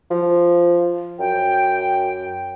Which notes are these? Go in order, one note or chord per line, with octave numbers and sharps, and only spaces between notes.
F3
F#2 G5